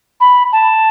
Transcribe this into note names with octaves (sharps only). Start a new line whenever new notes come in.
B5
A5